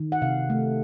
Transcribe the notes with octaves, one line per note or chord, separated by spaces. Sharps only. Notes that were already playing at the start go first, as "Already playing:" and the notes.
Already playing: D#3
F#5
C3 F5
A3